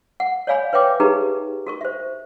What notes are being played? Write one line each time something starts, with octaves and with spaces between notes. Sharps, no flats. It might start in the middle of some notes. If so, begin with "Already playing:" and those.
F#5
C#5 D5 F5 G#5 B5
B4 C#5 E5 G5 D6
D#4 G4 G#4 A#4 B4 A#5
F#4 A#4 C#6
C5 E5